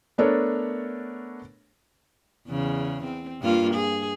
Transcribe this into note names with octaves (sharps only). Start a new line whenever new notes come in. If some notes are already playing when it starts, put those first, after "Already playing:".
A3 B3 D4 A4 A#4 C#5
E2 C#3
C4
G2 A#3 F4
G#4